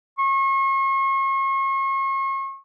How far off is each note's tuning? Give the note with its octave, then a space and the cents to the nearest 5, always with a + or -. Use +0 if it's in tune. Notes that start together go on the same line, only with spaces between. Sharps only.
C#6 -40